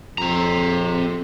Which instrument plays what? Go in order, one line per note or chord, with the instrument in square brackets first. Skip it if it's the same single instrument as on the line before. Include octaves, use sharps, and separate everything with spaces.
[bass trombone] F2 [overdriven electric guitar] C4 A#5